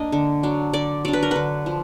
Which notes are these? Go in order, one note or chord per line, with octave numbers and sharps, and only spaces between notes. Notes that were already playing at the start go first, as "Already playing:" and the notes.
Already playing: A#3 D4 D#5
D3
F#3 D4
D3 D5
F#3 D4 D5
B4
A#4
D3 B4
F3